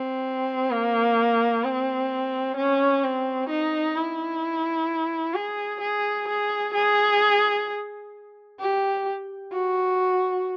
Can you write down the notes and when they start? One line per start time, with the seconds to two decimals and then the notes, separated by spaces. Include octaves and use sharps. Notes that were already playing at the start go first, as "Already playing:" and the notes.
Already playing: C4
0.71 A#3
1.64 C4
2.57 C#4
3.03 C4
3.49 D#4
3.96 E4
5.34 G#4
5.81 G#4
6.28 G#4
6.74 G#4
8.60 G4
9.52 F#4